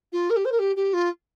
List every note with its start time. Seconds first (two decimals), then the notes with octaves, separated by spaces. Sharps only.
0.12 F4
0.30 A#4
0.36 G4
0.45 C5
0.52 A#4
0.59 G4
0.76 G4
0.93 F4